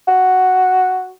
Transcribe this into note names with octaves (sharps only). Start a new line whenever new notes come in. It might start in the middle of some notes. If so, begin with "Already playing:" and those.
F#4